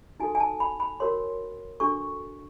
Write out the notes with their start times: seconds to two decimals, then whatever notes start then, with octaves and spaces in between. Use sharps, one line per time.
0.20 D#4 F#4 A4 G#5
0.35 G#5
0.40 A5
0.60 B5
0.80 B5
1.00 F#4 A#4 C#5 C6
1.80 D4 F#4 A4 C#6